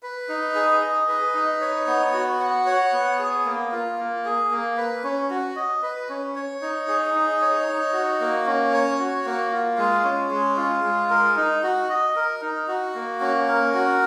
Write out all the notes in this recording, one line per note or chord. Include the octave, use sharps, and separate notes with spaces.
B4
D#4
G#4
D#5
B4
D#4
C#5
B3
F#4
F#5
C#5
B3
G#4
A#3
F4
A#3
G#4
A#3
B4
C#4
F#4
D#5
B4
C#4
C#5
D#4
G#4
D#4
C#5
D#4
F#4
A#3
C#4
C#5
F#4
A#3
F4
G#3
C#4
G#3
F4
G#3
A#4
D#4
F#4
D#5
A#4
D#4
F#4
A#3
C#4
A#4
F#4